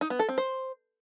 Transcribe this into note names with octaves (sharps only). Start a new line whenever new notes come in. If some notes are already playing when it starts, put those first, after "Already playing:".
D#4
B3
A4
C4
C5